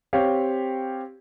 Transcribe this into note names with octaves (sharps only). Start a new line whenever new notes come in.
C4 G4 C#5 F5